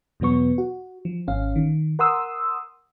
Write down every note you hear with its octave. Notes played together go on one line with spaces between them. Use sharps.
E2 B2 F#3 B3 C#6
F#4
F3
G#1 C#4 F5
D#3
A#4 F#5 C6 D#6 E6